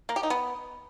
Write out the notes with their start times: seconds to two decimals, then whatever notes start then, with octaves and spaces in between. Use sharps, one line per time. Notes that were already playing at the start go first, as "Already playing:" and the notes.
0.09 A#3
0.16 G4
0.23 D#4
0.30 B3